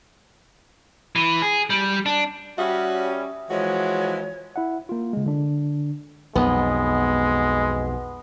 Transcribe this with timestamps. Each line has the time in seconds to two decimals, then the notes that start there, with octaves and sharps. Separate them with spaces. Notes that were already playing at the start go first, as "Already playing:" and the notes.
1.16 E3
1.42 G#4
1.70 G3
2.06 D4
2.58 G3 C#4 F#4 E5 D#6
3.50 E3 F3 G#3 F#4 C#5
4.56 E4 E5 F#5
4.89 A#3 F4
5.13 C#3 G#3
5.26 D3 D4
6.35 B1 F2 G#3 B3